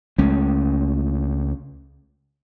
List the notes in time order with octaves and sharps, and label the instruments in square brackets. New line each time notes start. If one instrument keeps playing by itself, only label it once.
[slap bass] C#2 G#3 A3 C#4